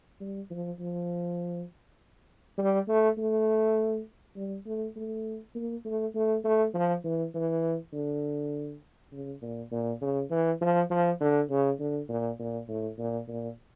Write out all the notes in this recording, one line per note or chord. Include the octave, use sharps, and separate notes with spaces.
G3
F3
F3
G3
A3
A3
G3
A3
A3
A#3
A3
A3
A3
F3
E3
E3
D3
C#3
A#2
A#2
C#3
E3
F3
F3
D3
C#3
D3
A#2
A#2
A2
A#2
A#2